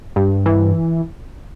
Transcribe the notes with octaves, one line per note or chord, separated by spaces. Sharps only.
G2
E3